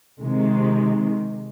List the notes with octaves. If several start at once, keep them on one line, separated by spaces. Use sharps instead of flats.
C3 D#3 G#3